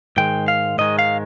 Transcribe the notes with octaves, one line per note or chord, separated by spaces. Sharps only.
G#2 D#3 G#3 G5
F5
G#2 D#3 G#3 D#5
F5